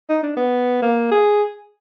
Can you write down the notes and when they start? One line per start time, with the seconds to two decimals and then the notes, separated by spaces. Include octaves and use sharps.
0.10 D#4
0.23 D4
0.37 B3
0.82 A#3
1.12 G#4